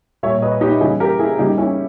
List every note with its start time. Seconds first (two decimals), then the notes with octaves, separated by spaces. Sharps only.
0.23 A#2 G3 C#5 E5
0.42 B4 D#5
0.61 D#4 G4
0.81 C#3 E3 G3 E4 G#4
1.00 G4 A#4
1.19 E4 G#4
1.39 C#3 G3 D#4 G4
1.58 C#4 E4